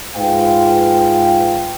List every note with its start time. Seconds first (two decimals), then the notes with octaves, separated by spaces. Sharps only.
0.16 G#2 F4 G#4 B4 F5 G5